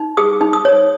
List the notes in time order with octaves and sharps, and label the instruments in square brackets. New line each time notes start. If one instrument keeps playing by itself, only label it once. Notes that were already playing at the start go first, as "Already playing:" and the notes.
Already playing: [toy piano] D#4
G#4 D#6
D#4
D#6
C#5